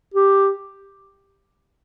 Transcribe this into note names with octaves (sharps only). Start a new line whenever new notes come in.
G4